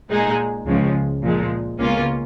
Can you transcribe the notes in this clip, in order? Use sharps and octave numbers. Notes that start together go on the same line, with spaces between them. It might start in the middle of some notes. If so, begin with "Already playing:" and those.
A#2 G#3 D#4 G#4
C#2 C#3 F3 G#3
A#2 F3 G#3
C#2 B2 A#3 C#4 F4